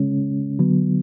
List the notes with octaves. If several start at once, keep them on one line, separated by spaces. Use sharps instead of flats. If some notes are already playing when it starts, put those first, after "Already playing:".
Already playing: C#3 G#3 C#4
D3 F#3 B3